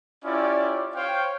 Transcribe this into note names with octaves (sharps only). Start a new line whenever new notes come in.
C#4 E4 F4 G4 D5
C5 C#5 F5 G5